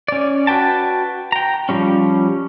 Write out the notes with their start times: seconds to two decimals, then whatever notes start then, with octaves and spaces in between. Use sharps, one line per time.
0.08 C#4 D5
0.47 F#4 B4 G5 A5
1.32 G5 A#5
1.69 F3 G3 C#4